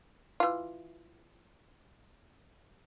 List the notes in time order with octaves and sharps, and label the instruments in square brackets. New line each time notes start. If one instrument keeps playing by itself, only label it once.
[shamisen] E3 F4